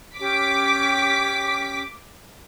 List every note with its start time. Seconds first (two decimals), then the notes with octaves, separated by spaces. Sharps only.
0.18 C#4 G4 D6 B6